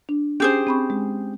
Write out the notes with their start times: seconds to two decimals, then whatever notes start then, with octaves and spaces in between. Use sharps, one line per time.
0.09 D4
0.40 C#4 G4 G#4 C5
0.67 C4 B5 C#6
0.90 G#3